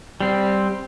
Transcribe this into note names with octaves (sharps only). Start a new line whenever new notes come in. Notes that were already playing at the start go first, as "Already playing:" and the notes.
G3 C4